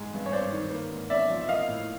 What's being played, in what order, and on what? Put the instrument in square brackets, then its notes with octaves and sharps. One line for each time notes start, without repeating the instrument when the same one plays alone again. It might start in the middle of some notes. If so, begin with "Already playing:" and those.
Already playing: [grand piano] G#2 G#3
G2
C#5
G2 C5 D5
D#3
A#3
G#2
C#4 D5 E5
F3
E5
A#3 D#5 F5
A2